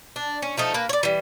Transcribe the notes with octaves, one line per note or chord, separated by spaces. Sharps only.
D4
C#4
F3 A3 D#4
A#3 B4
C#5 D5
E3 G3